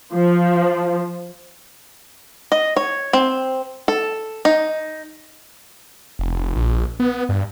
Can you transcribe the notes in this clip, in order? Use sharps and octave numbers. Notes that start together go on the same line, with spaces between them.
F3
D#5
C#5
C4
A4
D#4
F1
A#1
B3
G2